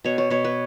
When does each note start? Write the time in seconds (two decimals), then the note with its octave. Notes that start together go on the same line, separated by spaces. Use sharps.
0.04 B2 C#5
0.18 C#5
0.30 B2 C#5
0.44 B4